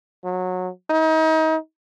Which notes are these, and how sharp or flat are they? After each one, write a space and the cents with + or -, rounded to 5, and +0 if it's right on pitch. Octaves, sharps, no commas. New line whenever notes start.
F#3 -20
D#4 +35